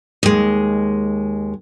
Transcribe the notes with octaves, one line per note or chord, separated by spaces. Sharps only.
D#2 G#3